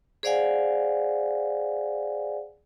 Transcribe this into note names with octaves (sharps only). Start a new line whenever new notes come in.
G#4 C5 D5 F5 F#5 G#5